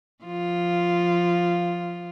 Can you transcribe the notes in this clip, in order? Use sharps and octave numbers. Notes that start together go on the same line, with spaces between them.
F3 F4